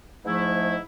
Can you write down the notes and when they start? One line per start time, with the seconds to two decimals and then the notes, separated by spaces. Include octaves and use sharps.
0.25 G#2 F3 A3 E4